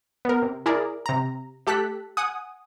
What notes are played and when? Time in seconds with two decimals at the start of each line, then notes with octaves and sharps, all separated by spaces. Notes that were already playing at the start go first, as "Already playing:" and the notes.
0.25 B3 A#4
0.42 C3
0.66 E4 G#4 A#4 D5
1.06 C3 A#5
1.67 A3 G4 A4 F#6 B6
2.17 F#5 G#5 D#6